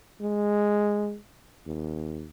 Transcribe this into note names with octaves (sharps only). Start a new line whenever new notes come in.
G#3
D#2